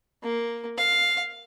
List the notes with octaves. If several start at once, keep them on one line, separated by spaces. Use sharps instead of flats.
A#3
F5